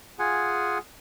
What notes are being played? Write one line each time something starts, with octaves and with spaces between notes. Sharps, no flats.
F4 G#4 F#5 G#5